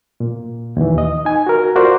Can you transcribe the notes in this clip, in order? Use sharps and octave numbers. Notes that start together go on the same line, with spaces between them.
A#2
D#2 E3
D#5
D#4 G#5
F#4 A#4
F4 F#4 A#4 C5 D5